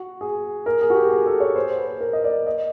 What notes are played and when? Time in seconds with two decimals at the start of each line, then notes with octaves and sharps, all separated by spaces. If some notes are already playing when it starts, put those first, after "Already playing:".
Already playing: F#4
0.21 G#4
0.66 A#4
0.81 G#4
0.90 F#4
0.95 G4
1.10 G#4
1.26 A4
1.40 C#5
1.56 C5
1.79 B4
2.00 A#4
2.13 D#5
2.24 D5
2.47 D#5